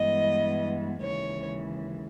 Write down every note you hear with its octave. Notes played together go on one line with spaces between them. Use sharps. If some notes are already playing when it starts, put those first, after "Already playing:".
Already playing: G2 E3 G#3 B3 D#5
D#2 C#3 E3 G#3 C#5